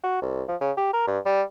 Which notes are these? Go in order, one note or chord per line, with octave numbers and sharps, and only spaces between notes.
F#4
C2
F3
C#3
G4
A#4
G2
G3